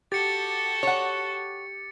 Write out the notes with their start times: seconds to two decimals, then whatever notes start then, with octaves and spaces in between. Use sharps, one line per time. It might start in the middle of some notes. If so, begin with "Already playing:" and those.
0.12 F#4 G4 A4 A6 C#7
0.83 C#5 F#5